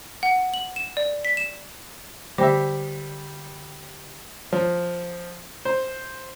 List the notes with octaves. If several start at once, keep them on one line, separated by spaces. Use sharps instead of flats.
F#5
F#7
E7
D5
B6
E7
D3 G3 G4 C5 E5
F3
C5